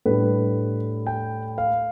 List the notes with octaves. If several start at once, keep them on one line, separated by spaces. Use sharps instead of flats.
A2 G3 D4 B4
G5
F5